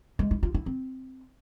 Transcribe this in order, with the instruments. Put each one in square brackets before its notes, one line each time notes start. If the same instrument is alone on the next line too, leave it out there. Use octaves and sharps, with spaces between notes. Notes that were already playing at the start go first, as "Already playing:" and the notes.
[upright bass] G#3
E4
F4
E4
C4